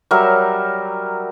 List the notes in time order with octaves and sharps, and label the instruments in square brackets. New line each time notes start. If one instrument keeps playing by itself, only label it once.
[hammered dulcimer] F#3 G3 A#4 E5